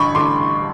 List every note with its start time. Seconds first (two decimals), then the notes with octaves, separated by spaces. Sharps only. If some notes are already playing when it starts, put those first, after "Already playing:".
Already playing: A1 G2 D3 B5 C#6
0.15 A1 D3 C6 D6